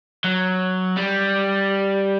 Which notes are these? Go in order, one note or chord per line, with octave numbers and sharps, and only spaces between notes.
F#3
G3